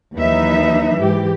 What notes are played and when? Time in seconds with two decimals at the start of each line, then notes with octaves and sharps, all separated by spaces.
0.15 D#2 E3 F#3 D#4 B4 E5
1.00 G#2 E3 G4